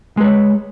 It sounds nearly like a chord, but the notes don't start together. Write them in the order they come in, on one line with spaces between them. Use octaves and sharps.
G#3 B4 C#5